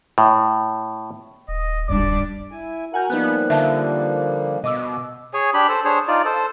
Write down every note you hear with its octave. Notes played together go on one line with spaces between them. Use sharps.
A2
D#1 D#5
G#1 D2 G2 G3 D4 D6
E4 G#5
F#4 A#4 F#5 G#5 A#5 G6
F3 G3 A#3 B3 D#4 B4 F#6
D3 E5 A5
B2 D#5 D6 E6
G#4 C#5 G#5
D4 G4 B5
A4 C5
D4 G#4 C5 C#5
D#4 F4 D5
A4 C5